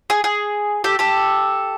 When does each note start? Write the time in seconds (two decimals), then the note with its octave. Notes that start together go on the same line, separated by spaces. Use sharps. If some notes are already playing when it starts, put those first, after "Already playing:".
0.10 G#4
0.24 G#4
0.84 G4 A4
0.99 G4 A4